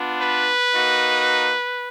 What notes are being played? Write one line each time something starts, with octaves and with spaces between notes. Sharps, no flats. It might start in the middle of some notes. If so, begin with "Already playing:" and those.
Already playing: B3 D4 F4
B4
A#3 D#4 F#4